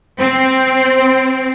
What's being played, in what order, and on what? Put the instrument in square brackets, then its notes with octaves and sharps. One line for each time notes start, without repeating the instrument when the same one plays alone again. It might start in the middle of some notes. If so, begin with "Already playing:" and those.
[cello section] C4